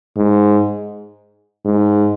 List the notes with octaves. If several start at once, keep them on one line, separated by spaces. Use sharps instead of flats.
G#2
G#2